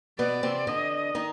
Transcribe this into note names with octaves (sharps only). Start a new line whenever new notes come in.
B2 B3 D5
C3 C4
D3 D4 D#5
D#3 D#4